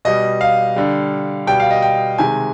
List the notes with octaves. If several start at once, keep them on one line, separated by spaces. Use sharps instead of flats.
B2 G3 D#5
F5
D3 G3
B2 G3 G5
F5
D#5
G5
C3 D#3 G#3 G#5